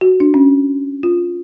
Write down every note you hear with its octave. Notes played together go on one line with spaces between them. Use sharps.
F#4
D4
C#4
F4